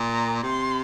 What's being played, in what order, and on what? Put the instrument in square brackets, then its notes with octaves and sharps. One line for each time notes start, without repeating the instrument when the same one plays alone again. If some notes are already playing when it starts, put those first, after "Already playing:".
Already playing: [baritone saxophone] A#2
[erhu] A#5
[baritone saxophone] C3 [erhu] C6